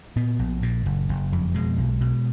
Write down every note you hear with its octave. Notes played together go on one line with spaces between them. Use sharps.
A#2 B3
A#1
A#2
F#1
F#1
F2
B2 G#3
B1
B2